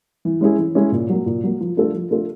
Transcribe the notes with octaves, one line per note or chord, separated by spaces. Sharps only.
E3
G#3 C#4 E4 G#4
E3
G#3 C#4 E4 G#4
A#2
F#3 A#3
A#2
F#3 A#3
F3
A3 D4 F4 A4
F3
A3 D4 F4 A4